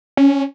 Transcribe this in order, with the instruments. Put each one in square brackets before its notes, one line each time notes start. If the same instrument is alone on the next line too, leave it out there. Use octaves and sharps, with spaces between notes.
[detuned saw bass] C#4